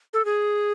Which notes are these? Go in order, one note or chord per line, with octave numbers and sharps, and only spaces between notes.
A4
G#4